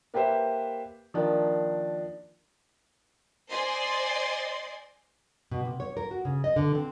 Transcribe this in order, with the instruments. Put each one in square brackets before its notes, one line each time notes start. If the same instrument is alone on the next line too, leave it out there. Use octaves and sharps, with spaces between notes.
[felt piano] A#3 G4 B4 C5 E5
D#3 F3 A#3 D4
[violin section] C5 D5 D#5 G#5 C6
[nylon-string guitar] B2
C3
C#5
A#4
F#4
C#3
D#5
D3
C4